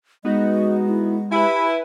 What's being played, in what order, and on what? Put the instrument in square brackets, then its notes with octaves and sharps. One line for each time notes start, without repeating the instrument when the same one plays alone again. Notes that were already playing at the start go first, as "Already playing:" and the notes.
[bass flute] G#3 [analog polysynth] B3 D#4 F#4 [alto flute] D#5
[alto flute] E4
[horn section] E4 [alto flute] G4 [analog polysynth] B4 G#5